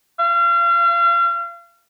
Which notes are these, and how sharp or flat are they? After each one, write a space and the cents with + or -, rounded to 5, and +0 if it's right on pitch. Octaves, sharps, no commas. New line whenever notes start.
F5 -35